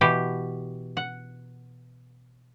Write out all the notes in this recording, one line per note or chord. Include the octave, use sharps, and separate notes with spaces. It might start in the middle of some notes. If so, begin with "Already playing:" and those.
B2 E3 G4
F#5